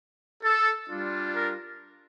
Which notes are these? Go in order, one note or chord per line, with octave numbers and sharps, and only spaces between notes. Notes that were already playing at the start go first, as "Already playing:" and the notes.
A4
G3 D4 F4
A#4